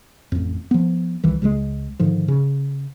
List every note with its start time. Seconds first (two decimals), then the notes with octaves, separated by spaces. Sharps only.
0.32 A1 F2
0.71 F3 B3
1.24 C2 D#3 E3
1.42 C#2 C#3 E3 G#3
2.00 G#2 D3 D#3 F3
2.28 C#3